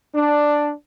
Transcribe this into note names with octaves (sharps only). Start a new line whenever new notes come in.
D4